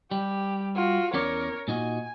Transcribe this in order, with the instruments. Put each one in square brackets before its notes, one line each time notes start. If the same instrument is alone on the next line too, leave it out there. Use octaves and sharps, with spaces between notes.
[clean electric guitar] G3 [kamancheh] G4
[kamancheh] F4 F#4
[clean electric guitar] E2 C#4 D5 [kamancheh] A#4 C#5
[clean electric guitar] A#2 D#4 F#4 [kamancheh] G#5